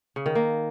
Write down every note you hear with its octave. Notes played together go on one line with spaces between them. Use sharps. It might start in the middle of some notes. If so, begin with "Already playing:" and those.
C#3
D#3
A#3